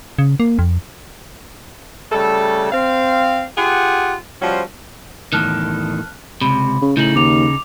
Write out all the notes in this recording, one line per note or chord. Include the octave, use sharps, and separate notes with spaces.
C#3
A#3
F2
C#3 G3 A3 A4
C4 F5
F4 G4 G#4 F#5
F3 G3 C#4 F#4 C5
E2 A2 D#3 A5 F6 F#6
C#2 C3 B5
C#3
A2 C#3 D#4 G6 F#7
D#2 D6 F7